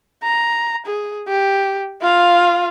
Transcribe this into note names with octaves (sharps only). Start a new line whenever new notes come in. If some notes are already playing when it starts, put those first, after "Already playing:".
A#5
G#4
G4
F4 F5